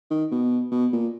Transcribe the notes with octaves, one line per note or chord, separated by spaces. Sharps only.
D#3
B2
B2
A#2